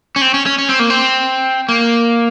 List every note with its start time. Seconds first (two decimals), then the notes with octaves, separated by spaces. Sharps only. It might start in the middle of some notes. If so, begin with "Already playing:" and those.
0.16 C#4
0.22 C4
0.34 C#4
0.46 C#4
0.58 C#4
0.69 C4
0.80 A#3
0.90 C4
1.69 A#3